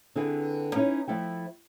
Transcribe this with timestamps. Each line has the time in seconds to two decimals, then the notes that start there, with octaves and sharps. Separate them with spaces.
0.16 D3 C4 E4 G#4 B4
0.75 C#4 D#4 E4 C#5
1.08 F3 A3 E4 G5